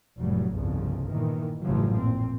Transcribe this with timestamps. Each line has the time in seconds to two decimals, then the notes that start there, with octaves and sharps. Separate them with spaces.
0.18 F1 A2 F#3 G3
0.54 G1 C2 F2 C#3
1.08 A#2 D#3 E3
1.61 A1 F#2 C#3 F3 F#3
1.95 A#2 C4